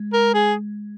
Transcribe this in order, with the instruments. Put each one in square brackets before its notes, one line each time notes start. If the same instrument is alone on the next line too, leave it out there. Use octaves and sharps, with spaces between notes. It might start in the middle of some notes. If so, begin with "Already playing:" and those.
Already playing: [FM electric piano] G#3
[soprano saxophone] A#4
G#4